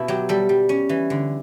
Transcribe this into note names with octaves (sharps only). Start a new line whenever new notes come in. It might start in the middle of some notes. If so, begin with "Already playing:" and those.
Already playing: B2 E4 B4
F#3 G4
G3 A4
G3
C#4
E3
D3